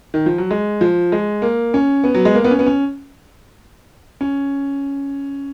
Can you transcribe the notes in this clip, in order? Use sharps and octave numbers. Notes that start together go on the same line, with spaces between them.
D#3
F3
F#3
G#3
F3
G#3
A#3
C#4
B3
F#3
G#3
A#3
B3
C#4
B3
C#4
C#4